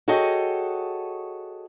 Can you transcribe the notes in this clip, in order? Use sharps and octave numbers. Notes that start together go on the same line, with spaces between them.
F#4 G#4 A4 C#5 D#5 G5